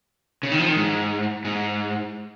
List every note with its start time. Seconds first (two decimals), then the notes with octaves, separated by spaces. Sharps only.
0.43 C#3
0.52 D#3
0.60 F3
0.68 D#3
0.76 G#2
1.45 G#2